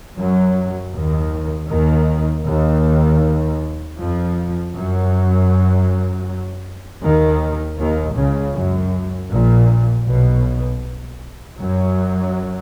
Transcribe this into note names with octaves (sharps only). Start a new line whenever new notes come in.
F#2 F#3
D#2 D#3
D#2 D#3
D#2 D#3
F2 F3
F#2 F#3
D#2 D#3
D#2 D#3
C#2 C#3
F#2
A#1 A#2
B1 B2
F#2 F#3